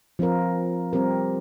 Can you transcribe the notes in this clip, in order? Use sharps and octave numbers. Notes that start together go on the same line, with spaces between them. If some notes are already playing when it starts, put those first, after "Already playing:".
F3 C4 F4 A#4
G3 C4 G4 A#4